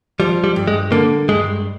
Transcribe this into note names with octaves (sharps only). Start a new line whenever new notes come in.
F3 G3
G3
G2
G#3
D3 A#3
G2 G#3